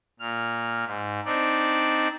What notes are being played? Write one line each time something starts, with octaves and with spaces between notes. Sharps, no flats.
A#2 F6
G#2
C4 D4 D#4 D5